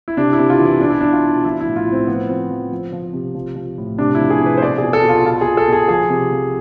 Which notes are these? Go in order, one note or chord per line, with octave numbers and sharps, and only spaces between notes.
E4
C3 D4
E4
C3
F4
E3
E4
B2 D4
E4
B2 D4
F4
B2
F3 E4
A2 E4
F4
A2
C4
F3 B3
F3 C4
F3
F3
F3
C3
F3
F3
A2
C3 D4
E4
F3
G#4
C3 B4
C5
B2 D5
G#4
B2
A4
B2
F4
B2 F4
G#4
B2
A4
B2 G#4
F3 G#4
C3
F3